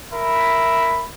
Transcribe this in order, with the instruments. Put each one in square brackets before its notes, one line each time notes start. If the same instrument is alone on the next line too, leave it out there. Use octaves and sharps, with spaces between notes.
[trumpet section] A#4 E5 B5